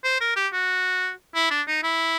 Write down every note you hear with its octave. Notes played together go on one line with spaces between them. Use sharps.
C5
A#4
G4
F#4
E4
D4
D#4
E4